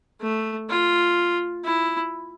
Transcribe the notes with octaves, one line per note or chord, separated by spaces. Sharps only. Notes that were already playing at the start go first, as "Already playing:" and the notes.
A3
F4
E4